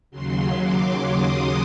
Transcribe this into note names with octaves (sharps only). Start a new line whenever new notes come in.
D#2 C#3 F#3 C6
D6
D#6